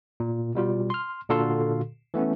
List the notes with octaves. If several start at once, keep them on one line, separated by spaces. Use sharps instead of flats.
A#2
B2 G3 F4
C6 F6
A#2 D3 F#4 A4 F5 C6
E3 A3 B3 C#4